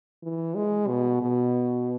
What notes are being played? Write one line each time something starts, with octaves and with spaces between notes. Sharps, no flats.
E3
G#3
B2
B2